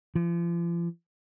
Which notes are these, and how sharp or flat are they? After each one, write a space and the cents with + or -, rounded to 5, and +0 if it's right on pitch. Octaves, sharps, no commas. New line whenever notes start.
F3 -40